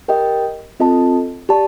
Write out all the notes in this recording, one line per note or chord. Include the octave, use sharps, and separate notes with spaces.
G4 A#4 D#5 G5
C4 F4 A4 D#5 A5
G4 D5 A5